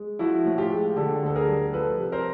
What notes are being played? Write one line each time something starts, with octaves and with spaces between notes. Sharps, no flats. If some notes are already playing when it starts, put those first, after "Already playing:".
Already playing: G#3
F3 E4 F#4
A2
F4 G4
G#3
D3 G4 A4
D2 A4
G#4 A#4
G3
F3 A4 B4
C3
A#4 C5